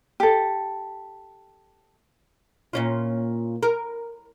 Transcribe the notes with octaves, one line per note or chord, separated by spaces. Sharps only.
G4 A4
A#2 C#4 F4
A#4